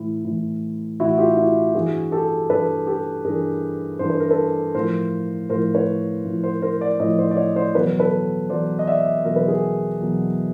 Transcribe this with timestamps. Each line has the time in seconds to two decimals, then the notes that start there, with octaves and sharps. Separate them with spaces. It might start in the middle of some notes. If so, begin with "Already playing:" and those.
Already playing: A2 E3
0.25 A2 E3
1.00 A2 E3 E4 F#4
1.18 F4 G4
1.37 E4 F#4
1.75 G2 E3 F#4 G#4
2.12 G4 A4
2.50 G2 E3 A4 B4
2.87 G4 A4
3.25 G2 E3 G#4 A#4
3.99 G2 E3 C5
4.10 B4
4.20 A#4
4.30 A4 B4
4.75 A2 F3 A#4 C5
5.50 A2 F3 A#4 C5
5.75 B4 C#5
6.25 A2 F3
6.43 A#4 C5
6.62 A#4 C5
6.81 C5 D5
7.00 A2 C#5 D#5
7.03 F3
7.18 C5 D5
7.31 D5
7.37 C#5 D#5
7.56 C5 D5
7.75 E2 B2 F#3 B4 C#5
8.00 A4 B4
8.49 E2 B2 F#3 C5 D5
8.79 D#5
8.87 D5 E5
9.25 E2 B2 F#3 A#4
9.36 B4
9.48 G#4 A#4
10.00 E2 B2 F#3